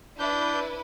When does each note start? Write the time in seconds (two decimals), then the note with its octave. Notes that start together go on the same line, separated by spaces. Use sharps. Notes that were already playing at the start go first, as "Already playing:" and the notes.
0.19 D4 E4 B4 G6